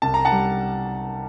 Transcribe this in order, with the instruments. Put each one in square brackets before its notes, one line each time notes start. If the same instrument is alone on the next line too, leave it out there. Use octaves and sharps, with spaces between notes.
[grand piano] C2 A5
A#5
F#5 A5
G3